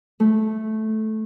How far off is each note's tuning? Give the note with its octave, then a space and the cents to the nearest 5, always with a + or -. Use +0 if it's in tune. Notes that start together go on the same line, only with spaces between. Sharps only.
A3 -10